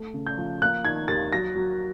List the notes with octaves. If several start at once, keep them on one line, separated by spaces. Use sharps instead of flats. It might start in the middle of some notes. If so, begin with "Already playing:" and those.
Already playing: A3
C#3
G6
F3
A#3 F#6
D#3 G#6
D#2 A6
F#3 A#6
F#3